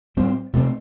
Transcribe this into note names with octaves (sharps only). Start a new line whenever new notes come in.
A2 G3 C4
C3 A3 C4